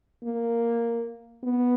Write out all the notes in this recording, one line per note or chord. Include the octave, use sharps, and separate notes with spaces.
A#3
B3